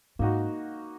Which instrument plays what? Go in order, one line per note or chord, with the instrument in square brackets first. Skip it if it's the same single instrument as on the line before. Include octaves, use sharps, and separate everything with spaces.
[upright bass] G#2 [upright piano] A#3 D#4 F#4